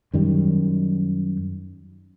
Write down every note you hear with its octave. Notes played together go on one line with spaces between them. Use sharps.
F#2 D#3 G3